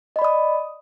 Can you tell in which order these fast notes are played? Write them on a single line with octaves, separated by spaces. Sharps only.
D#5 B5 D5 D#6